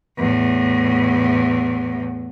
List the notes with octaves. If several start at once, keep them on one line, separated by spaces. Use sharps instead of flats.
E2 A2